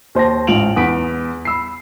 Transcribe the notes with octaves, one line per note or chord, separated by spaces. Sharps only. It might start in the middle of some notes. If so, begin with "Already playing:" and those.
D#2 C5 A5 A#6
A1 G#2 F4 D7 F7 F#7
E2 F#5 B6 D7
B5 E6 C7